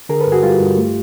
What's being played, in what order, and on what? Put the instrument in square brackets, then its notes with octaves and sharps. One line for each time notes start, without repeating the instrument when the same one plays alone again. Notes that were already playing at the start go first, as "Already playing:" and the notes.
[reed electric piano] D3 G#4 A#4
A4 B4
G2
F#4 G#4
G3 F4 G4
G2
A3